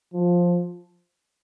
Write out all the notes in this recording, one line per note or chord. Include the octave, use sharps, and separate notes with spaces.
F3